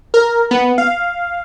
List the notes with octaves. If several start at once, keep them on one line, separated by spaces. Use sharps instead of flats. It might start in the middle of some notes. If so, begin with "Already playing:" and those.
A#4
B3
F5